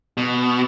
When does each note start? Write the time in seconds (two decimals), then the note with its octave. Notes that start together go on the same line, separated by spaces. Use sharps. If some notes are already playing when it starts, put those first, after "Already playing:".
0.17 B2